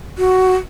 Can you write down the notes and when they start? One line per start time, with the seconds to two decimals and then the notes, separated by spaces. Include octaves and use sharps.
0.18 F#4